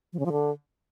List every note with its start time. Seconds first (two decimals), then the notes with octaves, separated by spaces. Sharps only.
0.13 F3
0.19 C#3
0.26 F3
0.32 D3